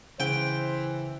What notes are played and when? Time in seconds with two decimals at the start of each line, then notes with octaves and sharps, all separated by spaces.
0.20 C#3 E3 C5 G5